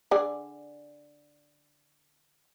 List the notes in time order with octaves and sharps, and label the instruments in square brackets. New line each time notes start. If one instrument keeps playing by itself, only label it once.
[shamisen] D3 G#4 D5